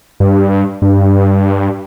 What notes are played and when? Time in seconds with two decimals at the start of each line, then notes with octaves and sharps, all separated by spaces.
0.20 G2
0.82 G2